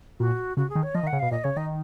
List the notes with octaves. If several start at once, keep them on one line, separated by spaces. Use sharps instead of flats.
A#2 F#4
C#3 F#4
G#4
D#3
C#5
F3 D#5
D#3
F#5
C#3
B2 F5
A#2 D#5
C#3 C#5
D#3 D#5